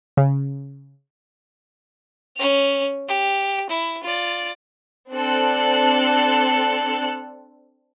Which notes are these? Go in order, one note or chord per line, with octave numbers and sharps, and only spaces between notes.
C#3
C#4 F7
G4
E4
F4 D5
C4 D4 A4 F#6